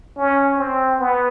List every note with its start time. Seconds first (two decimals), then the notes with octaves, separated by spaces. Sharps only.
0.17 C#4
0.57 C4
0.99 B3